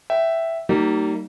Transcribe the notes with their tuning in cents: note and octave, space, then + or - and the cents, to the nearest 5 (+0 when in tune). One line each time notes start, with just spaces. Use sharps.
E5 +0 G5 -25
G3 -40 A#3 -35 D#4 +0